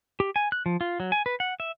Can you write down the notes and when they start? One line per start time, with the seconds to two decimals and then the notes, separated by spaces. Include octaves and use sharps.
0.20 G4
0.36 G#5
0.52 F#6
0.66 F3
0.81 F4
1.00 F#3
1.12 G#5
1.26 B4
1.40 F#5
1.60 E5